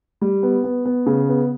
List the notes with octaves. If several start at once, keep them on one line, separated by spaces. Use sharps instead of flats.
G3
B3
B3
B3
C#3
B3